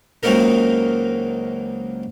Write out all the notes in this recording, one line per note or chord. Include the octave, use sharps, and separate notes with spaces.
C#2 F#3 A#3 C4 D#4 A#4